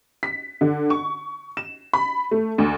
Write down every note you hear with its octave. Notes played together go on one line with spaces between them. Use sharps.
B6
D3
C#6
E7
B5
A3
D2